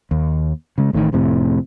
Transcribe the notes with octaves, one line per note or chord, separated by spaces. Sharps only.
D#2
C#3 G#3
A1 A2 D3 D#3
F1 F2 A2 C3